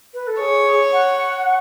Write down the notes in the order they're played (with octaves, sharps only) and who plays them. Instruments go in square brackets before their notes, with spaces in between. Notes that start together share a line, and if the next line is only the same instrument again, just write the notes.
[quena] B4
A4
[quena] G#4 [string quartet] C#5
[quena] F#5